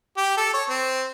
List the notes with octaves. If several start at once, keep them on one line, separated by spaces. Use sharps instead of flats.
G4
A4
C#5
C4